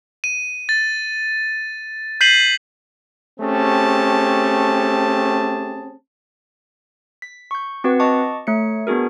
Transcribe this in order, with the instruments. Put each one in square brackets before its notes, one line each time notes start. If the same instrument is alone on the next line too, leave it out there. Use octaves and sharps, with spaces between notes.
[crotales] D#7
A6
G6 B6 C7 D#7 F#7
[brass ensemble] A3 C4 C#4 G4 G#4 A5
[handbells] B6
C#6 G6
C4 F#4 B4 F#5
D#5 A5 C#6 D6
A3 C#5 C#7
B3 D4 F#4 G#4 A#4